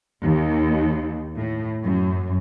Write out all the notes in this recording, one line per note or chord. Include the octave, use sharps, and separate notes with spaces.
D#2
A2
F#2